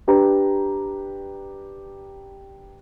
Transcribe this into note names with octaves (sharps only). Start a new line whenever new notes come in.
D4 G4 B4 A#5